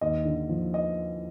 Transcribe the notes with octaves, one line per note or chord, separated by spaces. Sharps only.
D#2 D#5
D3
F3
D#5